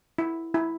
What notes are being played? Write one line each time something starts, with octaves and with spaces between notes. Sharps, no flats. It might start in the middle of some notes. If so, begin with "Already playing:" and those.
E4
E4